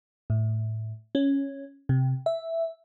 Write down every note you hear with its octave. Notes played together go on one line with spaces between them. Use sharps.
A2
C#4
C3
E5